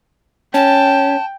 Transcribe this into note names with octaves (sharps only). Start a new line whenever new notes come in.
C#4 G5 A5